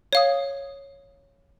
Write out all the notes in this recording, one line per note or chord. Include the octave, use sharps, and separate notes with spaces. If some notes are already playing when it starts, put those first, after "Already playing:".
C#5 F5 D#6